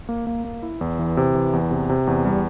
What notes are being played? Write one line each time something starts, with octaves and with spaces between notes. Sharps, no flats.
A#3
A#3
A#3
E4
E2
E3
C3
E3
E2
C3
C3
E2
G3